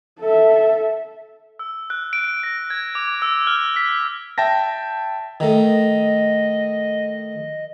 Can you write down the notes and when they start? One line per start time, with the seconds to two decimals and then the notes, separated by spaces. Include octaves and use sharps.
0.20 A4 E5
1.59 E6
1.90 F#6
2.13 D7
2.43 A#6
2.70 G#6
2.95 D6
3.22 E6
3.47 F6
3.76 B6
4.38 E5 G5 A5 A#6
5.40 D#3 A3 D#5